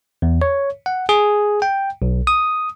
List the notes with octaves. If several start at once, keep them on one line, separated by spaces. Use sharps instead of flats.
E2
C#5
F#5
G#4
G5
B1
D#6